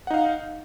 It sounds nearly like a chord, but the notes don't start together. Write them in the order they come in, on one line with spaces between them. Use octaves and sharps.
F#5 D#4 F5